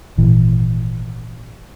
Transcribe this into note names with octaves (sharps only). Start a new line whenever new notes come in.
G#1 A#2 E3